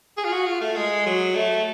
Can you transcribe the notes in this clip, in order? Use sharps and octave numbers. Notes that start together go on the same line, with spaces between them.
G#4
F4
F#4
F4
A3
G#3
F#3
A3